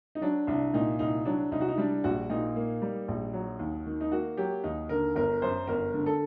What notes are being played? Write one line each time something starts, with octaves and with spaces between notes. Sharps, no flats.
D#4
F#3 D4
C2 D4
A#2 D#4
C2 D#4
F#3 D4
C2 D#4
F#4
D#4
G3 D4
A#1 F#4
A#2 D#4
A#3
G3
A#1
F#3
D#2
D#3
D#4
A#3 F#4
F#3 G4
D#2 D#4
D3 A#4
G1 A#4
F#2 C5
G1 A#4
D3
A4